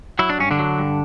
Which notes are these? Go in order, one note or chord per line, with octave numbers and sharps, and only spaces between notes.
F#3 E4
D4
G2 C#4
D3 D4
F#3
G2